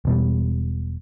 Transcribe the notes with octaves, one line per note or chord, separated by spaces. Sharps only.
E1 B2 G3